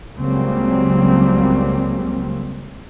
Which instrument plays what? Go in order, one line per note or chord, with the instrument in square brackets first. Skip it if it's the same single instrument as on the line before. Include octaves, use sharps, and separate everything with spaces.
[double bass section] C#2 C#3 F#3 G3 A#3 C4